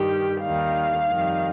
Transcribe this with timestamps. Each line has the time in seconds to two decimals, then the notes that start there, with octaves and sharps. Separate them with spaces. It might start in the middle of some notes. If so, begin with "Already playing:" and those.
Already playing: G2 D#3 G3 G4
0.40 D#2 D#3 G3 F5
1.10 F2 D#3 G3